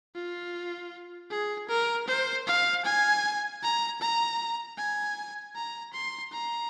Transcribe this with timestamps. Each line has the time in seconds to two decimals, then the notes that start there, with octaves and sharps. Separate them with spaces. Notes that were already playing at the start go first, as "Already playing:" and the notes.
0.15 F4
1.30 G#4
1.69 A#4
2.07 C5
2.47 F5
2.85 G#5
3.63 A#5
4.01 A#5
4.78 G#5
5.55 A#5
5.93 C6
6.32 A#5